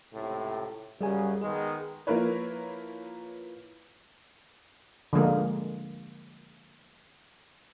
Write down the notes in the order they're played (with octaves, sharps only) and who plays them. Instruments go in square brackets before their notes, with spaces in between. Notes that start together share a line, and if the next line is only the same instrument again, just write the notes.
[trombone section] C#2 A2 C3
[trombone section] F#2 C#3 [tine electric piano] G3 G#4 G#5
[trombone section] D#3 G#3 B3 [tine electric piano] G#4
[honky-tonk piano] F3 A#3 E4 A#4 B4 C#5
[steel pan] D3 F3 G#3 A#3